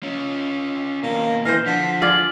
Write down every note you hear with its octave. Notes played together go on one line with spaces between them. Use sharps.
C#4 F4
D#2 B2 A#3
E3 C5 F5 A#6
D3 F3 B6
F4 G#4 D5 F#7